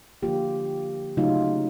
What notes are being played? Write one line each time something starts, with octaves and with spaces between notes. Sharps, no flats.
D3 F3 A#3 F4 G4
C#3 F#3 A3 D#4 F4